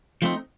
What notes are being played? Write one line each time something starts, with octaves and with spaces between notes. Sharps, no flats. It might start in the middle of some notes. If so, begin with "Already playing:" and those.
F3 A3 C4 D#4